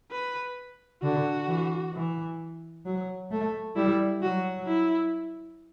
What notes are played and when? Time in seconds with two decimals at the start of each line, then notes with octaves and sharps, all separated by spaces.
0.12 B4
1.03 D3 F#4
1.48 E3
1.94 E3
2.85 F#3
3.31 A3
3.76 G3 E4
4.22 F#3 F#4
4.67 E4